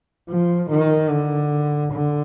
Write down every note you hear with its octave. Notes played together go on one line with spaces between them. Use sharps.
F3
D#3
D3
D3